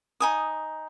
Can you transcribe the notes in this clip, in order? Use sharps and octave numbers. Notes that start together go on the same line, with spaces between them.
D#4 G#5 D#6